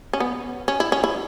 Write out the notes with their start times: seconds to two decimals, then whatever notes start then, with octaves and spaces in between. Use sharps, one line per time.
0.13 C#4
0.20 B3
0.68 C#4
0.80 E4
0.92 C#4
1.04 E4